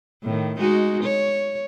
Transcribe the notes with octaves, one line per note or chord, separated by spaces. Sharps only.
A2 D#3
G#3 D#4 F#4
C#5